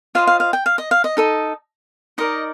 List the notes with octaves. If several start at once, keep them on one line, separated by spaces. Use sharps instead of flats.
F4 C5 D#5 F5
F5
F5
G5
F5
D#5
F5
D#5
D#4 A4 D#5
D#4 A#4 D5 D#5